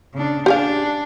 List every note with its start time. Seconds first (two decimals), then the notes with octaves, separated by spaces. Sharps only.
0.14 C#3 D4
0.46 D4 G4 G#4 F5